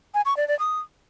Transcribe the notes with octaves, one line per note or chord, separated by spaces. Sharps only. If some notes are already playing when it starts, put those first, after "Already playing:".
G#5
C#6
D5
D5
D#6